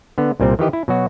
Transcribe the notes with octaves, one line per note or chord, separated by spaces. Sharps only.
D3 B3
C2 A#2 G3 C4
D#3 E3 G4 D#5
E4
B2 F#3 F#4